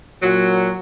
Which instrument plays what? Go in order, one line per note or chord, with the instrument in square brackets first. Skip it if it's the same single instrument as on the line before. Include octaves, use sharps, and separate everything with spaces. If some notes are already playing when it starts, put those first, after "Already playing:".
[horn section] A#2 F#3